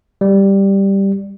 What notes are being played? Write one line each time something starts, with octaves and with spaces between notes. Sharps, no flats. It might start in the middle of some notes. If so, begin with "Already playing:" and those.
G3